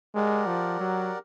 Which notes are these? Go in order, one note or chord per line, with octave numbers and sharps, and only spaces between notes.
G#3 G4 A#4 D5 F#5
F3
F#3